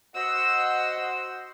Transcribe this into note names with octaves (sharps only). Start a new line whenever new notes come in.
F#4 C5 D#5 F#5 E6